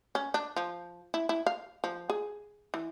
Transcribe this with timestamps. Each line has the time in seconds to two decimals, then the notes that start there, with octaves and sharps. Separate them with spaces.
0.15 C#4
0.34 D4
0.56 F3
1.14 E4
1.29 E4
1.46 F5
1.84 F3
2.10 G#4
2.74 E3